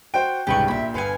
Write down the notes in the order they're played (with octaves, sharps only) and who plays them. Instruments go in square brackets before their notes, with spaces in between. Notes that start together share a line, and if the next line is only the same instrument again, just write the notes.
[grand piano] F#4 C5 [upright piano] G5
[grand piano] C2 G#2 C#3 [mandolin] G4 B4 C#6
[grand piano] A#1 A#2 [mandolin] E5 B5
[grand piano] G1 B4 C#7 [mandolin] F5 G#5